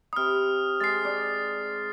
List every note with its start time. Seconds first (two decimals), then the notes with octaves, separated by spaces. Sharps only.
0.13 C3 B5 D#6 F6
0.80 G#3 A6 C7
1.05 D#4 D5